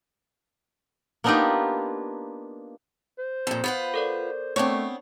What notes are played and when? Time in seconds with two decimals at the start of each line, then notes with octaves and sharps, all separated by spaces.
1.24 A#3 B3 D4 D#4 F4 G4
3.19 C5
3.47 F2 A#2 A4
3.64 B3 F4 B4 F#5
3.94 A4 A#4 D5
4.56 A3 B3 C4 D4 C#5